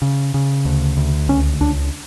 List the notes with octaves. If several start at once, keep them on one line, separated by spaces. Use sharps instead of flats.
C#3
C#3
D2
D2
C#2 C#4
C#2 D4